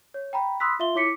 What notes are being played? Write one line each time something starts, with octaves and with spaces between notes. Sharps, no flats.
C#5
G5 A#5 B5
B5 C6 D#6 E6 F#6 B6
F4 E5 F5 C6 G7
E4 C#5 D6 B6 C#7